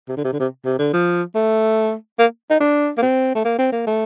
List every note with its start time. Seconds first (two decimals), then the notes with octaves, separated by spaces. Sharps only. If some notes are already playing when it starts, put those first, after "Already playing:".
0.09 C3
0.17 D3
0.24 C3
0.33 D3
0.40 C3
0.65 C3
0.79 D3
0.93 F3
1.35 A3
2.19 A#3
2.50 D#4
2.61 D4
2.98 A#3
3.02 C4
3.35 A3
3.45 A#3
3.59 C4
3.72 A#3
3.87 A3